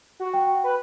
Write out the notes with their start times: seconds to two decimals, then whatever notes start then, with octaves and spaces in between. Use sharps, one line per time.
0.20 F#4
0.34 G5
0.64 B4